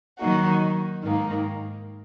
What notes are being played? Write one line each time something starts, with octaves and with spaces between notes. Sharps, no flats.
D#3 F#3 A#3 D#4 F#4
G#2 D#3 A#3